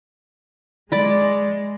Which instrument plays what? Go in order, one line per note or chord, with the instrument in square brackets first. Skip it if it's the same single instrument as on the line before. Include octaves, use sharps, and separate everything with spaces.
[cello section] G#3 [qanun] D5 B5